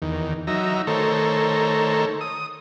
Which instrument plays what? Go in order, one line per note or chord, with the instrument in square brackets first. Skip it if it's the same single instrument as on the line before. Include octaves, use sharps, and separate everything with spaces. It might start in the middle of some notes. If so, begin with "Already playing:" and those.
[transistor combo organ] E2 D#3
F#3 D#4 E5 A#5
D#3 A3 A4 C5 C#5 A#5
D#6